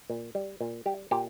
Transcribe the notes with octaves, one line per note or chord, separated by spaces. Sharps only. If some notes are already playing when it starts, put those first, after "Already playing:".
A#2
G3
A#2
G3 G4
A#2 G4